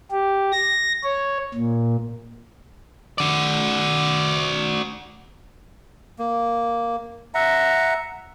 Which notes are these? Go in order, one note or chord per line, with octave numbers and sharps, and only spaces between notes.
G4
A#6
C#5
A#2
F#4 D5
A#3
E5 F#5 A#5